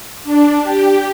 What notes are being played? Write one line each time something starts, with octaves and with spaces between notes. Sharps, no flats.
D4
G4